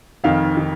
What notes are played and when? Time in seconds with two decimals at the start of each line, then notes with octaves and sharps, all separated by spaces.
0.24 F1 F2 D#3 F5
0.57 D#3